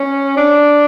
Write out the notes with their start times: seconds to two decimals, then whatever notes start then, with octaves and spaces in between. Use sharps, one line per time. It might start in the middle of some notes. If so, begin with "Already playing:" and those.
Already playing: C#4
0.37 D4